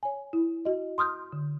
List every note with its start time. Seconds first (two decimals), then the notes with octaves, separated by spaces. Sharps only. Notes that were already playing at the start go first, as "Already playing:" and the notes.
0.03 C#5 G#5
0.33 E4
0.65 F#4 D#5
0.98 C6 D#6 F6 G6
1.32 D3